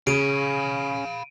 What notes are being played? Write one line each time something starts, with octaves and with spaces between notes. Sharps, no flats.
C#3 C#4 F5 B5 D7 D#7